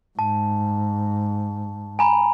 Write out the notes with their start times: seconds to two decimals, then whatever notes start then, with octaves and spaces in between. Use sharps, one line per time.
0.19 G#2 A5
1.99 G#5 A#5 B5